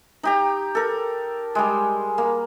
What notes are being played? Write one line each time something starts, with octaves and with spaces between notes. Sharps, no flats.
D#4 G4 A#5
A4 A#4
G3 G#3
A#3